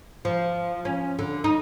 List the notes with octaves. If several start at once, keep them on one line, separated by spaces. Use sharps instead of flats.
F3
C#4
D3
D#4